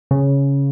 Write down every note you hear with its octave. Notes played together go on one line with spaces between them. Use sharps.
C#3